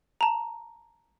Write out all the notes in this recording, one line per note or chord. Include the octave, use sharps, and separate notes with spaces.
A5 A#5